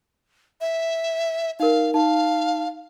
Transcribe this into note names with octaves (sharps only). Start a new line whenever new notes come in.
E5
D#4 A#4 F5
D#4 F5 A5